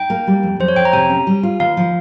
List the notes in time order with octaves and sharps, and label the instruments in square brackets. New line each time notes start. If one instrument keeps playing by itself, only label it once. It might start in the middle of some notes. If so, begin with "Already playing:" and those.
Already playing: [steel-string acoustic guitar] D#4 [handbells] G5
[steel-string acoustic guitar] A#3
G3
F2
[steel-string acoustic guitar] F2 [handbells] C5
[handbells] C#5
[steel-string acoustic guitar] F2 [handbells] G5
[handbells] A#5
[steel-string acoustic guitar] C3 [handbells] G#5
[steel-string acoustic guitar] C#4
G3
F4
[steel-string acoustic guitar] D#2 [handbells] F5
[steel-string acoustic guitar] F3